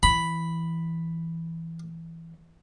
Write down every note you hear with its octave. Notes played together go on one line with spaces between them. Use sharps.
E3 B5